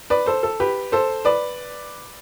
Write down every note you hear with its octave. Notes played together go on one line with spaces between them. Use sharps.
B4 D5
A4 C5
A4
G4 B4
A4 C5
B4 D5